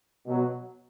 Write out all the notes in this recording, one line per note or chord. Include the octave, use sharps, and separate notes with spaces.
B2 F#3